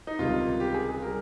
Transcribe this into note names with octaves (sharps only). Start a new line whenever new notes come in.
D#4
C#2 C3 D#3 G3 F4
G4
G#4
G#4
G3 A#4